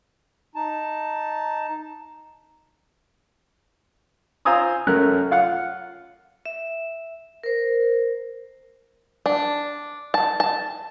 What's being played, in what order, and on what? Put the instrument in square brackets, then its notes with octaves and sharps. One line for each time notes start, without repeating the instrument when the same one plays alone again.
[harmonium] D#4 A5
[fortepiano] F4 C5 G#5 A#5 D#6 E6
F#2 A3 C#4 A#4 F6 F#6
F4 F5 F#5
[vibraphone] E5
A#4 C5
[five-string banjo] D4
A5
A5